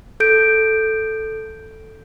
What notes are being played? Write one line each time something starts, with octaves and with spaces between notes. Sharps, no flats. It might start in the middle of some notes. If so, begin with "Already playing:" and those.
A4 G6 D7